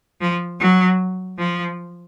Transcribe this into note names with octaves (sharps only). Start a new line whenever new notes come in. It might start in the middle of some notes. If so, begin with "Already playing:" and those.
F3
F#3
F3